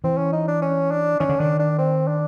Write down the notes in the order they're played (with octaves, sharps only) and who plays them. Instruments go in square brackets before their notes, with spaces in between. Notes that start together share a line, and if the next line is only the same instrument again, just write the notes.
[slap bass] E3 [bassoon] C4
[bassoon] C#4
D#4
D4
C#4
D4
[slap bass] D#3 [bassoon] C#4
[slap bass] D3
[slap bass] D#3 [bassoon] D4
[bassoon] D4
C4
D4